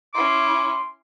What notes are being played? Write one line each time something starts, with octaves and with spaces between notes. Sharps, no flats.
C#4 E4 C6 D6